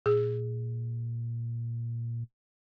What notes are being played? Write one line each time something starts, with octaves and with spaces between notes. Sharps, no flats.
A#2 G#4